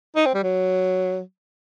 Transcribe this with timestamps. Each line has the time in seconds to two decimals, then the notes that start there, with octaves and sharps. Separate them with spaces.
0.16 D#4
0.26 C4
0.34 G3
0.43 F#3